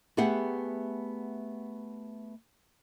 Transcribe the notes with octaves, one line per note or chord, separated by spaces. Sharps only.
A3 B3 G4 G#4 F#5